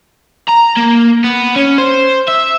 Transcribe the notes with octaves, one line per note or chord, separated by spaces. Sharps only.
A#5
A#3
B3
C#4
C5
E5